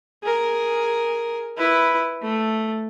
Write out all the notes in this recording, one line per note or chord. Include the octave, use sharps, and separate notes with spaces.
G#4 A#4
E4 B4
A3